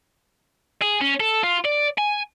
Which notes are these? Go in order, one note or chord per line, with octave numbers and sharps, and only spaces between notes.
G#4
C#4
A4
F4
D5
G#5